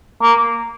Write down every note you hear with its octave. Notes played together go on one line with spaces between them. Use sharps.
A#3